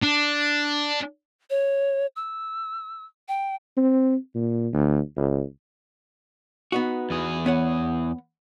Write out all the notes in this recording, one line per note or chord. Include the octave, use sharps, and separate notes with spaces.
D4
C#5
E6
G5
C4
A#2
D2
C#2
B3 D#4 F#4
E2 G#4
B3 C#5 F#5